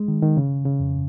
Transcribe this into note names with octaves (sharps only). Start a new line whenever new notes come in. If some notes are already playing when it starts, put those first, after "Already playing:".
Already playing: G#3
D#3
D#3
C#3
C#3
F2